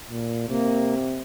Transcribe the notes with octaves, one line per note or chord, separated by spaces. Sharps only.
A#2
C3 A#3